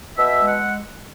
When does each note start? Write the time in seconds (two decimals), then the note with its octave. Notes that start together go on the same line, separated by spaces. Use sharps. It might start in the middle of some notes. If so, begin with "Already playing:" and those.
0.17 B2 E5
0.39 G#3
0.47 F#5